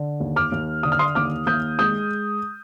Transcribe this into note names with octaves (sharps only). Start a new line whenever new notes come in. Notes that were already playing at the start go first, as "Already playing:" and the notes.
Already playing: D3
D#2
D6 F6
D#2
D3 D#6
F6
C6 D#6
D#2 D6 F6
D#2 D#6 G6
G#3 D#6 G6